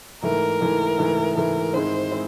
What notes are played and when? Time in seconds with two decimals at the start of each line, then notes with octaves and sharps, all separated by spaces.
0.22 G#2 E3 A3 A#4
0.61 G#2 E3 A3
0.98 G#2 E3 A3
1.35 G#2 E3 A3 A#4
1.73 G#2 D#3 G#3 C4 E4 C5
2.11 G#3 C4 E4